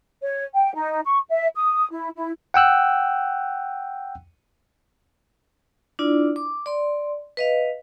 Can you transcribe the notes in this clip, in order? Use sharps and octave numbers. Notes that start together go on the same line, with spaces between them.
C#5
G5
D#4
C#6
E5
D#6
E4
E4
F#5 G5 E6 F#6
D4 E4 F4 D5
D6
D5 C6
B4 D#5 F5